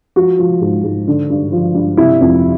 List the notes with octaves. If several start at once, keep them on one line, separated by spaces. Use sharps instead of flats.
F3 F#4
F3
G#2
G#2
D3
G2
F3
G2
C3 E4
F2